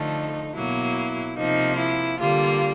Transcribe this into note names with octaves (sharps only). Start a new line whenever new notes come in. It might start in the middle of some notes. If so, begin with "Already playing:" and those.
Already playing: D3 F3 A3 D#4
B2 F#3 A#3 E4
C3 F3 A#3 D#4
E4
D3 G3 A#3 F4